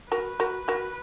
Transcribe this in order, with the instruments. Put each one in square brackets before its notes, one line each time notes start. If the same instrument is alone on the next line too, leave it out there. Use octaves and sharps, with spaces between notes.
[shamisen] F#4 A#4 [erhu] B4
[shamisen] F#4 A#4
F#4 A#4